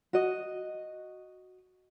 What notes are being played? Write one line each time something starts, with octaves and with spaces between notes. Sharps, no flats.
F#4 D#5